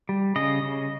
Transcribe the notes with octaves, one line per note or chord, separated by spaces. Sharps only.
G3
C#3 D#5
C#3